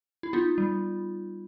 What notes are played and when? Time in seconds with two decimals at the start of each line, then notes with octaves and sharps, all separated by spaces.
0.23 E4
0.33 B3 D#4 F4
0.58 G3